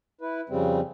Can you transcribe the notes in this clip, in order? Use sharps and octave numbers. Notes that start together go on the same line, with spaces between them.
E4 B4
F2 C#3 G3 C4